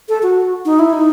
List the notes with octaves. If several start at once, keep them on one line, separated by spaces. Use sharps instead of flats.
A4
F#4
D#4
E4
D#4